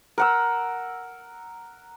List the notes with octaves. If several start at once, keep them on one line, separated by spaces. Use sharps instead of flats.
A#4 F#5 E6